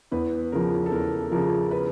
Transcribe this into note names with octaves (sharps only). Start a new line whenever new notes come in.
E2 B4
C#3 F3 A#4
A4
E2 A#4
C#3 F3 A#4
B4